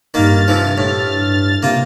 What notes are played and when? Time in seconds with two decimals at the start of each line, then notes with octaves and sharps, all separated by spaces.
0.14 G2 D#3 A#3 F6 A6
0.48 C3 E3 F3
0.78 A2
1.63 C3 A#3 F4